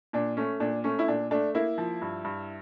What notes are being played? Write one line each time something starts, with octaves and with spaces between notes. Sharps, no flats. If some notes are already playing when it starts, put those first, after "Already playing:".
A#2 D4
A3 C#4
A#2 D4
A3 C#4
E4
A#2 D4
A3 D4
A#3 E4
F3
G2
G2